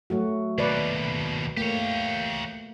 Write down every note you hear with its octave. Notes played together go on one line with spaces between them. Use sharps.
F#3 A3 F#4
D#2 B2 B4 D5
A3 A#3 G4 C#5